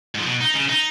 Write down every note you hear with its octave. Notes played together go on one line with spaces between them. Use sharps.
G#2 F3
B2
D#4
C#3
D#4